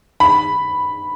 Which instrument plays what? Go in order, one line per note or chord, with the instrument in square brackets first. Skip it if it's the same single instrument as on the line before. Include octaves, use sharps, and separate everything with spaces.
[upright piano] B5